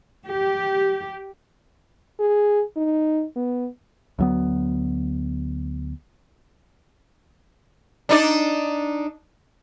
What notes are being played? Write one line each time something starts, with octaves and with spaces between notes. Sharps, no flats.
G4
G#4
D#4
B3
D2 F#3 B3
D4 D#4 D5